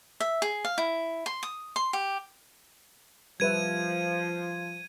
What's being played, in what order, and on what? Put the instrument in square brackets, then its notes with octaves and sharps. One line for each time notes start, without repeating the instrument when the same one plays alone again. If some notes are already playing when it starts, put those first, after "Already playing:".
[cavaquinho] E5
G#4
F5
E4
C6
D#6
C6
G4
[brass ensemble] F3 [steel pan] G3 B4 E5 [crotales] G#6 D#7